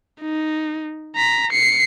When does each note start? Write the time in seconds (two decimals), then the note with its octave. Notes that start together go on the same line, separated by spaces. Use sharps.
0.21 D#4
1.16 A#5 B6
1.51 C7 C#7